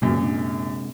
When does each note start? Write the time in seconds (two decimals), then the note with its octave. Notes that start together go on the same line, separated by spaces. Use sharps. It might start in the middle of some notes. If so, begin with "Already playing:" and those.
0.02 F#2 A#2 C#3 G#3 B3
0.21 C3 G#3 D4